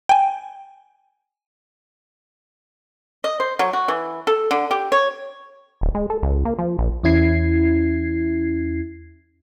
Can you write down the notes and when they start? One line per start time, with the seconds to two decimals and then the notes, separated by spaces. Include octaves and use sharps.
0.09 G5 G#5
3.24 D#5
3.40 C5
3.59 F#3
3.73 F#4
3.88 E3
4.27 A4
4.51 D3
4.71 G4
4.92 C#5
5.81 D1
5.95 G#3
6.10 A4
6.22 C#2
6.45 A#3
6.59 F3
6.79 A#1
7.03 E2 C#4 E4 G#6 C7